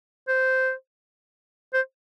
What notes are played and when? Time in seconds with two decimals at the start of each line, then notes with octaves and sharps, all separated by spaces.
0.28 C5
1.73 C5